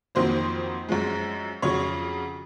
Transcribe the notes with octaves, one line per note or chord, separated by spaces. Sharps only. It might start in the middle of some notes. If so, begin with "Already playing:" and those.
F2 D#3 F#3 A#3 C5
F#2 F3 G#3
F2 C#3 F#3 C#5